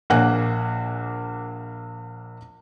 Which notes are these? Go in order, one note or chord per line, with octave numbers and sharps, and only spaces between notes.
A#1 A#3 F#5 G#5 F#6